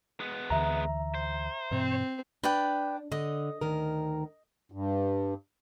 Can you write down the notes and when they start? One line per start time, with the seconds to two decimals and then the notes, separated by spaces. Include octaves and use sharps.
0.20 G#3 B3
0.50 D2 D3 E3 E5 A#5
1.15 C5
1.71 G2 B2 E3 C4
2.44 D4 B4 D5 G5
3.12 D3 D#5
3.61 D2 D#3 A#4
4.72 G2